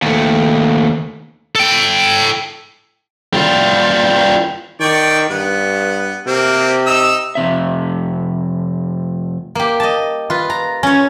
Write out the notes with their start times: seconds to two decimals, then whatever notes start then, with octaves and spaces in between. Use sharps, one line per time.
0.02 D#2 A3
1.56 A4 G5
3.34 G3 F4
4.81 D#3 D5 G5 C#6
5.30 G2 B3
6.27 C3 A#3 C4
6.86 D#4 E6
7.35 F2 C3 E5
9.55 A#3 G4
9.80 D#5 A5
10.30 F4 B4
10.50 A#5
10.83 C#4 C#5